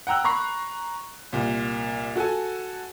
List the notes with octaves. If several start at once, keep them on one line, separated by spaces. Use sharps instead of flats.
F#5 G5 A#5 E6 F#6
A#5 B5 C#6 C7
C2 A#2
F#4 A4 F#5 G#5